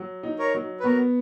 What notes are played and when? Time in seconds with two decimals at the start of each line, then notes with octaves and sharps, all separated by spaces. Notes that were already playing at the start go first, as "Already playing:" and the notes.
Already playing: F#3
0.23 D#4
0.39 A#4 C#5
0.54 F#3
0.80 B4
0.84 B3 F#4 A#4